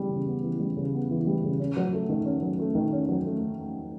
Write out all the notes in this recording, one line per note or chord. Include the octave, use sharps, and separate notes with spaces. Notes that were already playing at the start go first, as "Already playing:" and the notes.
Already playing: C#3 E3 G3 B3
C#3
B3
E3
G3
C#3
B3
E3
G3
C#3
C#4
F#3
A3
D#3
C#4
F#3
A3
D#3
C#4
F#3
A3